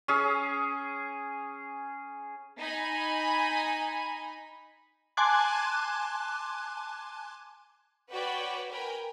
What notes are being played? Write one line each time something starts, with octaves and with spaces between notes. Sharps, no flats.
C#4 G#4
D#4 G#5 B5
G#5 A5 C6 D6 F#6 G#6
F#4 B4 C#5 D5 G5
A#4 B4 G5 G#5 B5